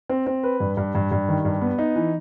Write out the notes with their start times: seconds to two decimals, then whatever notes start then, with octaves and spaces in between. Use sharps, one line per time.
0.09 C4
0.26 C4
0.43 B4
0.60 G2
0.77 G2
0.95 G2
1.11 G2
1.29 D#3
1.45 G2
1.62 B3
1.79 D#4
1.96 E3